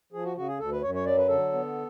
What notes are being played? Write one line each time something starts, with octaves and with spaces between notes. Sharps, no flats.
F3 G#4
F#4
C#3 F#4
G#4
D2 A4
B4
F#2 C#5
C#5
F#3 D5
B4
D3 A4
B3